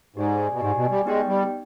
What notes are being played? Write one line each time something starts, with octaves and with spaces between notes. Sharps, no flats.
G#2 G4 D5 G#5
B2
G#2 G4 D5 G#5
B2
G3
G#3 B3 D#4 G4 D5 G5
G3